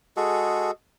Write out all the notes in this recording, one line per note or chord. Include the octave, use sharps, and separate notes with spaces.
G#3 F#4 G#4 A4